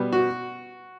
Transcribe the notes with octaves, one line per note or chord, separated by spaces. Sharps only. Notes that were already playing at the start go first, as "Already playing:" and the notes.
Already playing: B2 G3 B3
F#4